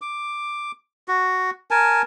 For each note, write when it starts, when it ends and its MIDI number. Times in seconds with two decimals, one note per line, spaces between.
0.02 0.72 86
1.08 1.51 66
1.71 2.02 70
1.71 2.02 80
1.71 2.02 81